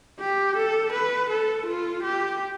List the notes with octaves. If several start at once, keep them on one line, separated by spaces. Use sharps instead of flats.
G4
A4
B4
A4
F4
G4